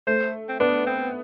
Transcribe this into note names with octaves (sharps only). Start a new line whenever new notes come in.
A3 C5
C4
B3 D4
C4